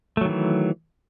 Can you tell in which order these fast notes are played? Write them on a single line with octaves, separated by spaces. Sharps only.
A3 F#3 D#3 E3